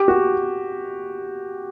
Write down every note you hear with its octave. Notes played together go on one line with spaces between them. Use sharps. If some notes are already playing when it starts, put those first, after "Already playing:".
Already playing: G4
F#4